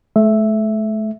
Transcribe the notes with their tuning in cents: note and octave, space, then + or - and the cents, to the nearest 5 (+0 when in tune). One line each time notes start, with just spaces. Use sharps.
A3 -35 E5 +0